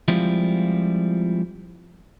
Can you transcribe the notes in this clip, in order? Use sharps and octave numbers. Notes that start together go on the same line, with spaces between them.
F3 G3 G#3 C4 E4 F4